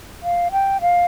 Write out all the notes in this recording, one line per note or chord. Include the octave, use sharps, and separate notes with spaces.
F5
G5
F5